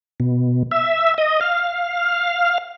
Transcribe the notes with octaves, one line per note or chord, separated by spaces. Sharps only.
B2
E5
D#5
F5